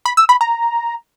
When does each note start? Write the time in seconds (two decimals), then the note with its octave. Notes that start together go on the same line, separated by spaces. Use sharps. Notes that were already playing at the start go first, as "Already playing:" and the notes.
0.06 B5
0.17 E6
0.29 B5
0.41 A#5